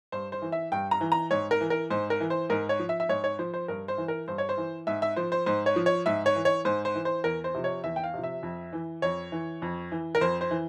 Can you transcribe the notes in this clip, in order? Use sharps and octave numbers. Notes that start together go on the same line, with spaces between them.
G2 C5
C5
E3
E5
G2 G5
A#5
E3
A#5
G#2 C#5
A#4
E3
A#4
G#2 C5
A#4
E3
C5
G#2 A#4
C#5
F3
E5
E5
G#2 C#5
C#5
F3 C5
C5
G2 A#4
C5
E3
A#4
G2 C5
C#5
C5
E3
G#2 E5
E5
F3 C5
C5
G#2 C5
C#5
F3
C#5
G#2 E5
C#5
E3
C#5
G#2 C5
C5
E3
C5
E2 A#4
C5
C3 F3
C#5
E2 E5
G5
F5
C3 F3
E5
F2
E3
F2 C#5
E3
F2
E3
A#4
F2 C5
C5
E3